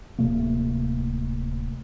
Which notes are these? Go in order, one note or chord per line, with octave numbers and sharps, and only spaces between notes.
D1 C3 A3 A#3